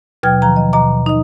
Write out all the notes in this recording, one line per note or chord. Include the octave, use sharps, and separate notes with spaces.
D#2 B2 F#3 G5 F6 G#6
D#3 F3 A#5
D#5
D#2 B2 D#5 A#5 D6
D#4 D#5